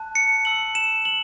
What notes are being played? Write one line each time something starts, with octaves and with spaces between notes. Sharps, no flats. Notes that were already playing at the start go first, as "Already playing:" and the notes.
Already playing: A5 F#6
C#7
A5 E6 F#7
E7
F#7